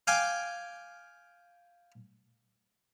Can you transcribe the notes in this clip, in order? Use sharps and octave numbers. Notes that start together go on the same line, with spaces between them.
F5 G5 G#5 D6